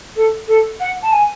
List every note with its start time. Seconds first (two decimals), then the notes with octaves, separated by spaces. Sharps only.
0.16 A4
0.48 A4
0.80 F#5
1.03 A5
1.12 G#5